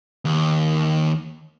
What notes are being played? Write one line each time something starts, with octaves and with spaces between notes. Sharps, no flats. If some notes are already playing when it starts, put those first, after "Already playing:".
D#2